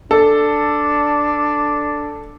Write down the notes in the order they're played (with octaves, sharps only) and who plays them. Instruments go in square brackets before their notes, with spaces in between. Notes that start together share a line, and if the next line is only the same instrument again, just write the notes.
[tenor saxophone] D4 [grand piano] A4